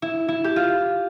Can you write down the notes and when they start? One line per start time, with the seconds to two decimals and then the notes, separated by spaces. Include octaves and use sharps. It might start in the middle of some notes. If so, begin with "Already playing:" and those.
0.02 E4
0.28 E4
0.44 G4
0.56 F4